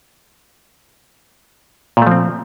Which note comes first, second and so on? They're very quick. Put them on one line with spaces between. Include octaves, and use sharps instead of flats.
A#2 A3 F3 C4